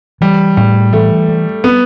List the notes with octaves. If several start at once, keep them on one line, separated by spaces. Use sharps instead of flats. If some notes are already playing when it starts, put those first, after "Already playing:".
E3 G3
A2 G3
E3 A3
G3
B3